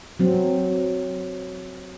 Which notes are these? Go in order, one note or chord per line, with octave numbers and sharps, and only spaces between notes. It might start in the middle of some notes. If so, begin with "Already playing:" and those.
F#3 C4